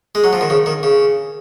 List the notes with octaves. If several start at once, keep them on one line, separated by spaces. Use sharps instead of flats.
G#3
F#3
F3
D#3
C#3
D#3
C#3